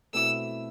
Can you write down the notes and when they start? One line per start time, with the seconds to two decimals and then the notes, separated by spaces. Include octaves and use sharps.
0.13 B2 A3 C4 E4 E6